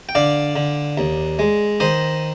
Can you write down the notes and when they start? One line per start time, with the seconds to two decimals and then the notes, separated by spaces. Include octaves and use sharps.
0.09 G5
0.15 D3 D5 F5
0.56 D3
0.98 D#2
1.39 G#3
1.80 D#3 C5 D#5